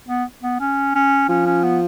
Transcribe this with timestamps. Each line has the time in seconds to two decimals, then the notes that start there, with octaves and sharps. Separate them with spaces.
0.08 B3
0.43 B3
0.60 C#4
0.95 C#4
1.29 F3 C#4
1.46 C#4
1.63 B3